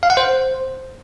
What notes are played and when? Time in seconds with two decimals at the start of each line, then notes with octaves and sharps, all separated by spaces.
0.03 F5
0.10 F#5
0.17 C5